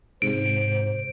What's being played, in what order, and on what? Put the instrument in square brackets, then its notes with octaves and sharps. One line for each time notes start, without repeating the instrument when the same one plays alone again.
[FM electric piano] G#2 C3 [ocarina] C5 [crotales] D7